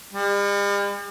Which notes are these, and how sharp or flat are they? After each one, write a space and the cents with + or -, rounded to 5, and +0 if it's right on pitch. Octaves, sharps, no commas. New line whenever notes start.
G3 +45